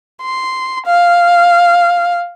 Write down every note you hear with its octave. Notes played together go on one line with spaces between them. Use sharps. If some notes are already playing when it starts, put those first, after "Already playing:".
C6
F5